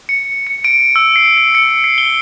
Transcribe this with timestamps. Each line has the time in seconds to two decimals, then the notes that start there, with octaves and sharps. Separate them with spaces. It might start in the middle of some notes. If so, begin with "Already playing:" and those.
0.09 C#7
0.47 C#7
0.64 D7
0.96 E6
1.16 C7
1.37 C7
1.55 C#7
1.84 C7
1.98 G7